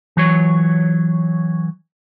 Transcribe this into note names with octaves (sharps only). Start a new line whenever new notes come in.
E3 F#3 C#5